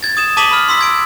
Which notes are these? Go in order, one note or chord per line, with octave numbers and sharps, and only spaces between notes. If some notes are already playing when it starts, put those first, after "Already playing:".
G#6 A6
D#6 G#6 E7
A5 D6 D#6 B6 E7 F#7
B5 F6
C6 E6 B6
G#6 D7